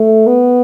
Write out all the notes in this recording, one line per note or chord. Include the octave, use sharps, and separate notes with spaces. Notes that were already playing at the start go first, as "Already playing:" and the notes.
Already playing: A3
B3